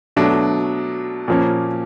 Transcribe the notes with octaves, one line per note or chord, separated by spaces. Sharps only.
B2 F#3 A3 D4
A#2 F3 A#3 C#4